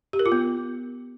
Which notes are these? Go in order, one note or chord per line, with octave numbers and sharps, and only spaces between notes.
G4
A#4
F4
B3